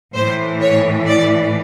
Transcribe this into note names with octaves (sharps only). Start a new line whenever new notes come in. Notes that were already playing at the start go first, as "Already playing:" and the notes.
A2 E3 C5
C#5
D5